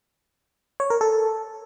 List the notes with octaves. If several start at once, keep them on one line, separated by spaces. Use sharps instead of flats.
C#5
A#4
A4